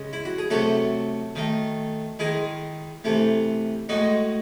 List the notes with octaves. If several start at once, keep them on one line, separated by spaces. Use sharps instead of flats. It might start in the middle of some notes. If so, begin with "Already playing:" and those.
Already playing: C#3 G#3
E4
F#4
G#4
C3 F#3 A3 F#4 A4
D#3 A3
D#3 G#3 E4 G#4
C3 E3 A3
A2 G#3 D#4 F#4